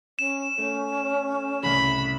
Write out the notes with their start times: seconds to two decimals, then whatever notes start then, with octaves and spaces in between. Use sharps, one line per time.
0.19 C#4 E7
0.58 A3 C#4
1.63 C2 A2 C#3 B5